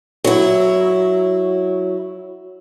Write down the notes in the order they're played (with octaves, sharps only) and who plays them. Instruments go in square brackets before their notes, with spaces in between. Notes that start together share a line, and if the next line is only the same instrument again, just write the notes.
[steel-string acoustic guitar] F#3 E4